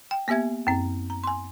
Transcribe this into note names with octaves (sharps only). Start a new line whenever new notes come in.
G5
A#3 B3 G4 E5 G#6
F#2 C4
A#5
G#5 C6